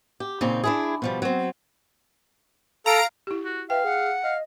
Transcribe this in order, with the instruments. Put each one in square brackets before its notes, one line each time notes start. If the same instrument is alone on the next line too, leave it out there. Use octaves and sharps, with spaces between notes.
[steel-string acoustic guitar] G4
A#2 C#3 C4 D#4
D4 E4 G#4
B2 F3 G3
F#3 C4
[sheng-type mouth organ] A4 [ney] F5 [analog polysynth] A#5 D7
[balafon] E4 G4
[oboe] F#4
[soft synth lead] B4 [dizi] E5 [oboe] F5 [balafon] G5
[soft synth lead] G#4 [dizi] F#5
[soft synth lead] D#5 [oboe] F5